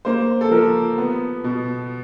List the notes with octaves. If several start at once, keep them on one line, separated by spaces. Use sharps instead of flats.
A#3 C5
A4
F3 A#4
B3
B2